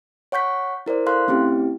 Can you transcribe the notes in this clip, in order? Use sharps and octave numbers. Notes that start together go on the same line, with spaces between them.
C#5 F#5 C#6 G6 B6
E4 A#4 C5 D5
A4 F5 C6 F#6
A3 C4 C#4 E4 G4